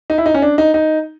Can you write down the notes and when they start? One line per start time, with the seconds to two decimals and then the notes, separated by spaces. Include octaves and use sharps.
0.10 D#4
0.18 E4
0.26 D#4
0.34 C#4
0.42 D4
0.58 D#4
0.74 D#4